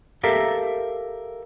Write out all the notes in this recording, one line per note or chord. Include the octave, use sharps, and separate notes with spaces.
G4 A4 A#4 E5 F5